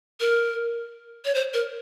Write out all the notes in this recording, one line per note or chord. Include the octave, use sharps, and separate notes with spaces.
A#4
C#5
C5
A#4